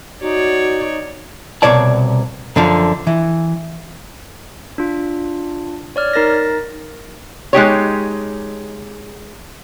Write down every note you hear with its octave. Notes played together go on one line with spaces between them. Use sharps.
D#4 F#4 C#5 D5
C2 B2 C#5 D5 A5
F#2 D3 F3
E3
D4 F4
C#5 D5 F6
D#4 A#4 A6 A#6
G#3 D#4 G4 C#5